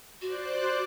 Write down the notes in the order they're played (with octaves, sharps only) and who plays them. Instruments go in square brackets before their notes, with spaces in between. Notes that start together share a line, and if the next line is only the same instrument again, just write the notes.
[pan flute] F#4 [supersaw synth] C5 D5 F#6